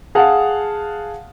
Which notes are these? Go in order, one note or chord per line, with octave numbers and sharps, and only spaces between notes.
G#4 F5 F#5 A5